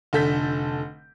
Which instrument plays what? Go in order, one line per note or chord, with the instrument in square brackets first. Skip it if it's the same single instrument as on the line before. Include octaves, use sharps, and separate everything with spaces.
[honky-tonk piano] F1 D3 A4 G6 B6